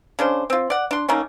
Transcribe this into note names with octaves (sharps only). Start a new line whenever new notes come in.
C#3 D4 C5
C4 F4
D5 F#5
D4 C6
D#3 A3 A#3 C#4